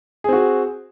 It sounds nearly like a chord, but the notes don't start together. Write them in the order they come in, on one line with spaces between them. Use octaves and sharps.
G#4 C4 F#4